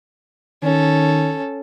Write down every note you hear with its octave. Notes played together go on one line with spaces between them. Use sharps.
D#3 C#4 A4